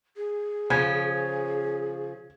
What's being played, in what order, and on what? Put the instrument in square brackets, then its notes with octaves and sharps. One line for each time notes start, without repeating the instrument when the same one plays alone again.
[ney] G#4
[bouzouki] C#3 F3 C#4 [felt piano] G#6